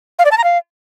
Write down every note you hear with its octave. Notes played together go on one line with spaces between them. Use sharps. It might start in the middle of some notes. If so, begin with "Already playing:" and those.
F5
D5
A5
A#5
F5